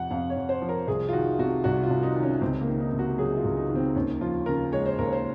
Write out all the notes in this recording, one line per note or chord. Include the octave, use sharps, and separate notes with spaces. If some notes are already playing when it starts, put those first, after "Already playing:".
Already playing: F2 C3 F3 F#5
F2 F5
C#5
F2
C5
F3
A#4
C2 G#4
F4
D#3 F#4
C3 F#4
C2 F#4
F4
C2
D#4
D#3
C#4
C#2 C4
A#3
D#3
D#4
C3
F#4
F#3 G#4
F4
C#2
D#4
D#3
C4
D#2 C#4
F3 F4
C#3 A#4
G#3 C#5
C5
D#2 A#4
C5